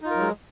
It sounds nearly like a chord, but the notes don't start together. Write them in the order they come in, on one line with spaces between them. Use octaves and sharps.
D#4 F4 A#4 F#3 G#3